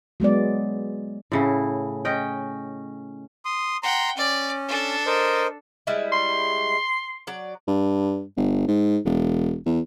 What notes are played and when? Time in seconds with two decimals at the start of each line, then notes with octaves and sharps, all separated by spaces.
0.20 F#3 G#3 B3 D5
1.32 A2 C#3 E4
2.05 C#4 D#5 G5
3.45 C6 D#6
3.83 F#5 G5 A#5 C6
4.18 C#4 D5
4.69 D4 A4
5.06 A#4 C5 D#5
5.87 G3 G#3 E4
6.12 C6
7.27 F#3 D5
7.68 G2
8.37 G1
8.68 G#2
9.05 E1
9.66 E2